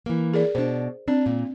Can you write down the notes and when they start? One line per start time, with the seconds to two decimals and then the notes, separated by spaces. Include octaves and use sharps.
0.06 E3 A#3
0.34 G#4 A#4 D5
0.55 B2 D4 C5
1.08 C4 D4
1.26 A#2